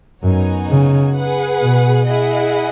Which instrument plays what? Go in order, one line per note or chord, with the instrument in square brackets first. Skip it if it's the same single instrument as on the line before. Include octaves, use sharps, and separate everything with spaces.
[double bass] F#2 [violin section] B3 D#4 F#4 C#5 G#5
[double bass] C#3
[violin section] G#4 B4 F#5
[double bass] B2
[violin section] E4 G#4 D#5 F#5